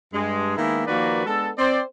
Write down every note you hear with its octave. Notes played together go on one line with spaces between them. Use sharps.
G2 G#3
D#3 G#3 A#3 B3 E4
D#3 F3 A#3 F#4 B4 D5
G#3 B3 D4 A4
C4 C5 D5